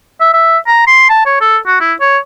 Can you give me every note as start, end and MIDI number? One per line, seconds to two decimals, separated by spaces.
0.20 0.32 76
0.33 0.58 76
0.67 0.86 82
0.87 1.09 84
1.10 1.22 81
1.26 1.36 73
1.41 1.57 69
1.67 1.77 66
1.81 1.94 64
2.01 2.18 73